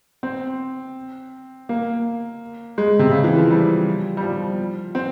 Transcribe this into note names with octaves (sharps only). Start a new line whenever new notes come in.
C4
A#3
G#3
C3
C#3
E3
F3
G3
G3
F3
C4